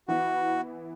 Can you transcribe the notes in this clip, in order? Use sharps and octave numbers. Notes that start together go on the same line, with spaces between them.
E3 B3 E4 F#4